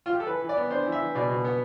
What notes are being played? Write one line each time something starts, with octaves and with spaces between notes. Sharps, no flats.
F4
G4
A4
E3 B4
E3
D5
B3
D4 C5
E3
E5
E3
B2 D5
B2
B3